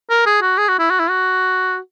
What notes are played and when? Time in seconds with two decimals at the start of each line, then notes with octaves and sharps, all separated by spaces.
0.10 A#4
0.26 G#4
0.42 F#4
0.58 G#4
0.68 F#4
0.79 E4
0.90 F#4
0.99 E4
1.09 F#4